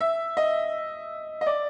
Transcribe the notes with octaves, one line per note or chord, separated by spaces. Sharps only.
E5
D#5
D#5
D5